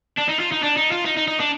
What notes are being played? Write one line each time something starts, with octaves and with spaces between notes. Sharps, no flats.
D4
D#4
F4
D#4
D4
D#4
F4
D#4
D#4
D#4
D4